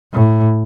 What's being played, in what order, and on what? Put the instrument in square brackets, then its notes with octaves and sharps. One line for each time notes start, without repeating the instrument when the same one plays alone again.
[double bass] A2